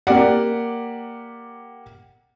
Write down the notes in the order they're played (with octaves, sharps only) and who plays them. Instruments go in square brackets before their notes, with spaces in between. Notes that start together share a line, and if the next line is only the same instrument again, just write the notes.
[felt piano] A#3 G4 D5 F#5